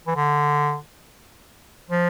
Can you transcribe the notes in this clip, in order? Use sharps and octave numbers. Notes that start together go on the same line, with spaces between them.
E3
D3
F3